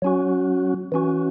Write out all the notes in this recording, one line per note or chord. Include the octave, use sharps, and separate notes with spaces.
F#3 C#4 F#4
E3 C#4 F#4